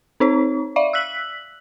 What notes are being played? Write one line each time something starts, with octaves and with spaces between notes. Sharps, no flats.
C4 D#4 C#5
D5 E5 F5
E6 F#6 B6 F#7